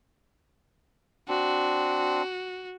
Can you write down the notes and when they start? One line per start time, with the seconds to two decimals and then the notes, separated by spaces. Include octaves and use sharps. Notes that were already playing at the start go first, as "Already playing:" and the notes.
1.28 C4 D4 F#4